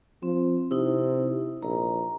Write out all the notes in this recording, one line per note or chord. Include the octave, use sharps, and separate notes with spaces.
F3 C4
C3 D#4 E4
A#1 A#5